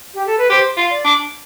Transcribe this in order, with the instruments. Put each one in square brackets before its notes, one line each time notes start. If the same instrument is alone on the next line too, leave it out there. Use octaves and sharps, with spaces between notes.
[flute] G4
A4
B4
[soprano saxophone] G4 [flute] C5
[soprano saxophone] F4
[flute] D5
[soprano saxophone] D4